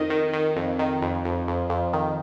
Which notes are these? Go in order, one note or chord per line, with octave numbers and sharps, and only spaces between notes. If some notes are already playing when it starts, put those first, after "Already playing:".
Already playing: F2 D#3 D#5
D#3
D#3
F2
D#3
F2
F2
F2
F2
D#3